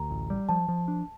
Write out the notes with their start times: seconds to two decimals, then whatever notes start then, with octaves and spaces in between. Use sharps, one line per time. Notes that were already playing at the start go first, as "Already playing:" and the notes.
Already playing: D2 A#5
0.11 A1
0.30 G3
0.49 F3 A5
0.69 F3
0.88 D4